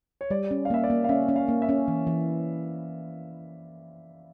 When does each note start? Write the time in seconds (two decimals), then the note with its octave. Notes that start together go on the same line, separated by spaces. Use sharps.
0.21 C#5
0.30 G3 D5
0.51 C#4
0.65 F5
0.70 A#3 E5
0.84 D5
0.90 A#3
1.04 F5
1.09 C#4 E5
1.28 C#4
1.36 F5
1.49 A#3
1.62 E5
1.69 C#4
1.88 E3
2.07 E3